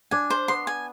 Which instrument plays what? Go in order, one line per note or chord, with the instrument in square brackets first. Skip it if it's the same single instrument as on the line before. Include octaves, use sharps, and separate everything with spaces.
[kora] D4 [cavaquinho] G#5
[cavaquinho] C5
[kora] B3 [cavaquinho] C6
[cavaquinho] G#5